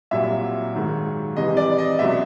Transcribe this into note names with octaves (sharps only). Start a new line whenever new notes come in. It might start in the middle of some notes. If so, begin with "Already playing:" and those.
C2 A#2 F#3 E5
G#2 D#3 F#3
C2 C3 E3 D#5
D5
D#5
C#2 B2 F#3 E5